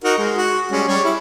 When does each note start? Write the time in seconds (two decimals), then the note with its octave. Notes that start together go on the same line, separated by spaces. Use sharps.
0.04 D#4 F#4 A#4
0.18 G#3
0.38 F#4
0.72 G3 G#3 C#4
0.88 G3 C#5
1.04 E4